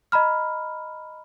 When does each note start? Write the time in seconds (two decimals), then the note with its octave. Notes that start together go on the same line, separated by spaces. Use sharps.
0.12 D#5 A#5 B5 F6